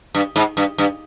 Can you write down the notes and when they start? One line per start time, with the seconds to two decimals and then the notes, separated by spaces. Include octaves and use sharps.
0.15 G2
0.36 G#2
0.57 G2
0.78 G2